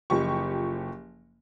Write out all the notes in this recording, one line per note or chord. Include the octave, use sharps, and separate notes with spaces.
F#1 F3 G4 C#6